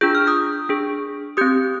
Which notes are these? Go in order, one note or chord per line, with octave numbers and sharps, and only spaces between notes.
D4 F4 G#4 G6
F6
D#6 G6
D4 G#4
C4 G4 D#6 G6